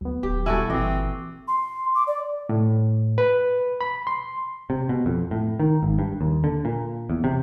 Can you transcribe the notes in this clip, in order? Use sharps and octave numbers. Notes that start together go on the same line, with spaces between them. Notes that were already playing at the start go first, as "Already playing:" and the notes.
D2 F#3 B3
D#1 G4
B2 G3 E4 F#4 A4 G#5
G1 A#2 E3 C4 D#5 D6
C6
D6
D5
A2
B4
B5
C6
C3
B2
F2
A2
D#3
G#1
G2
D#2
D3
A#2
E2
C3